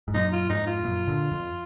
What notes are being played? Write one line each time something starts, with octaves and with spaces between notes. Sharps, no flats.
G#2
F#2 A#2 D#4
F4
F2 G#2 D#4
F4
F#2 A#2
A#2 D3
F2